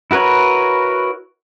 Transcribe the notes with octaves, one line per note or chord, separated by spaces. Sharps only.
E4 F#4 A#4 B4 C#5